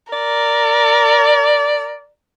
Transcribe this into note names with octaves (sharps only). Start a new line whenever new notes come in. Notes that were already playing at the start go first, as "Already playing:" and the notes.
A#4 D5